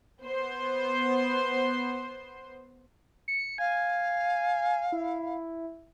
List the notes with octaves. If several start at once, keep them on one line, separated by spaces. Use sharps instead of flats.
B3 C5
C#7
F5 G#5
E4